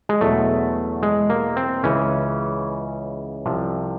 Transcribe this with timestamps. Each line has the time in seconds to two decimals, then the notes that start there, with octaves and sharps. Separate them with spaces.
0.09 G#3
0.21 E2 B2 F#3 A3
1.03 G#3
1.30 A#3
1.57 C4
1.84 C#2 C#3 E3 C#4
3.46 C2 C3 F3